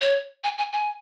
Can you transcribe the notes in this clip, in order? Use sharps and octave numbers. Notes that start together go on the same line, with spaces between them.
C#5
G#5
G#5
G#5